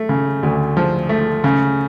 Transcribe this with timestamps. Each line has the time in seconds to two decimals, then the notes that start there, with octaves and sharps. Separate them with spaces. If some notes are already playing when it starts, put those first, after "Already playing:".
Already playing: A3
0.09 C#3
0.43 D2
0.77 F3
1.09 A3
1.44 C#3